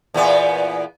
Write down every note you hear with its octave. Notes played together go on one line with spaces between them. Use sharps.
E2 A#2 B3